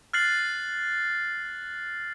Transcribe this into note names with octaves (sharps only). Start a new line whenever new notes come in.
F6 F#6 A6 C7 F#7